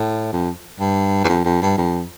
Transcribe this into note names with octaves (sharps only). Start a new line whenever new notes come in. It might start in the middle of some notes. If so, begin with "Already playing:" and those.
Already playing: A2
F2
G2
E2
F2
F2
G2
F2